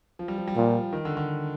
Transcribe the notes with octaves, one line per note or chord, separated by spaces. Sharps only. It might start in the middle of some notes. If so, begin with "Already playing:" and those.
F3
G3
F3
G3
A#2 F3
D#3
D3
D3